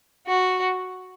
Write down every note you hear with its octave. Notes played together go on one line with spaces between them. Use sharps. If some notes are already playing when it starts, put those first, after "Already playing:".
F#4